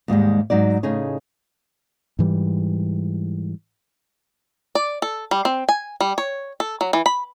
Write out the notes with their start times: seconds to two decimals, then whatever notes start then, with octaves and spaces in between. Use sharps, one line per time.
0.08 D#2 G#2 G3 G#3
0.50 G#2 F#3 D#4 D5
0.83 A2 C#3 D#4 G#4 C#5
2.19 G#2 E3 G3
4.75 D5
5.02 A4
5.31 G3
5.45 C4
5.69 G#5
6.01 G3
6.18 C#5
6.60 A4
6.81 F#3
6.93 E3
7.06 B5